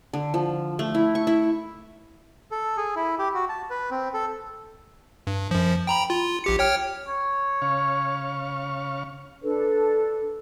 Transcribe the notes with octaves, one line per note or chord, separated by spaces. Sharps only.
D3
F3
A3
E4
C#6
E4
A4
G#4
E4
G4
F#4
A5
B4
C4
A4
G2
F#2 F3
G5 A#5 B5
F4
A#1 G4 C#7
C#5 G5 F6
C#5
C#3 F5 C#6
D4 A4 B4